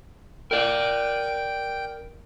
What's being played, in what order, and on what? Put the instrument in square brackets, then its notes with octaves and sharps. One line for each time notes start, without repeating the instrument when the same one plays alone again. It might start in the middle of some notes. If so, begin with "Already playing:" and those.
[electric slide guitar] A#4 D5 [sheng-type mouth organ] G5